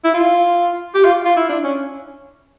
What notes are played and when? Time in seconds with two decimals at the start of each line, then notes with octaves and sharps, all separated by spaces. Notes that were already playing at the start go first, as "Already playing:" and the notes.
0.04 E4
0.14 F4
0.94 G4
1.05 F4
1.25 F4
1.36 E4
1.49 D4
1.63 C#4